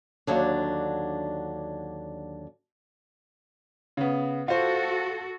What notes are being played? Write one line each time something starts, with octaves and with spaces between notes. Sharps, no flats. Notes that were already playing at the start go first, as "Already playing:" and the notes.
D#2 D3 F#3 D4
C#3 B3
F4 F#4 A4 C5